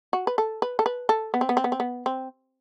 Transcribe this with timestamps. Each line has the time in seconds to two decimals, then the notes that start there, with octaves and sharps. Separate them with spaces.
0.13 F#4
0.27 B4
0.38 A4
0.62 B4
0.79 A4
0.86 B4
1.09 A4
1.34 B3
1.41 C4
1.49 B3
1.57 C4
1.64 B3
1.72 C4
1.80 B3
2.06 C4